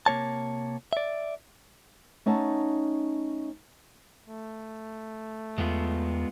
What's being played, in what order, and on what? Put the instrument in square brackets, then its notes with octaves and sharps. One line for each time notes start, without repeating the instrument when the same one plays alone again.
[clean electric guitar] C3 A#3 C#5 A5
D5 E5
[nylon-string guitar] A3 C#4 D#4 F#5 A5
[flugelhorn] A3
[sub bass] E2 [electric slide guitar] G#3 B3 F4